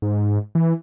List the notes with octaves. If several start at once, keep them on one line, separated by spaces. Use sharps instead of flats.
G#2
E3